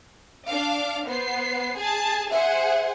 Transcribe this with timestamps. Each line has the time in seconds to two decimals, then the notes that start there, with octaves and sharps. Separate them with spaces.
0.47 D4 F5 D6
1.08 B3 C5 C7
1.78 G#4 A5
2.31 G#4 C5 E5 F#5